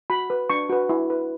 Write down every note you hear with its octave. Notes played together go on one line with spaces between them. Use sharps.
F#4 B5
B4
D4 C#6
F#4 B4
E4
B4